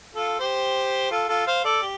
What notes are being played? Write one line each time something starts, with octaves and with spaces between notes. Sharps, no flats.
F4 A4
G4 C5
F4 A4
F4 A4
C5 F5
A4 D5
G4